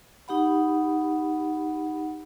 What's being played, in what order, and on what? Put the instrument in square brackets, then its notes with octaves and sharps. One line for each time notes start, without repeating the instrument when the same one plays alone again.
[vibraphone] D#4 G4 F#5 B5